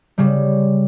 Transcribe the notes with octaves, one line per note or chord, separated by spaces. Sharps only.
C#3 G3